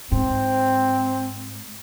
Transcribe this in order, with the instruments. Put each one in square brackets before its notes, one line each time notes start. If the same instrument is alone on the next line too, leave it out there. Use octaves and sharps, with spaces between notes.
[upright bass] G#2 [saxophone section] C4